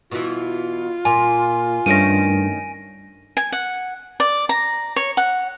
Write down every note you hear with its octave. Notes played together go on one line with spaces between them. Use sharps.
B2 E3 F4
A#2 G#5
G2 D#3 A3 C#4 A#6 D7 D#7
G#5
F#5
D5
A#5
C#5
F#5